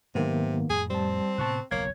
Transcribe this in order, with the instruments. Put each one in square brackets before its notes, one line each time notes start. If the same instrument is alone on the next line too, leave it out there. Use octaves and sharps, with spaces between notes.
[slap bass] G#2 F#3 G#3 [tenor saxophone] C3 [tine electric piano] D#3 A#3 B3
[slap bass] F2 A2 [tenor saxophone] G#4
[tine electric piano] G3 A5 [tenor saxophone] C4
[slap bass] A2 C3 B3 [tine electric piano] A5 C#6 F#6
[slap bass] F#1 B1 E2 [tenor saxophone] A#3 [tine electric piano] C#5 G#6